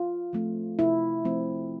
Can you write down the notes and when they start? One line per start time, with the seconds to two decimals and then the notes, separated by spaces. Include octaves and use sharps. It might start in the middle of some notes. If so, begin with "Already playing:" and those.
Already playing: F4
0.33 F3 A3 C4
0.79 C3 E4
1.25 F3 A3 C4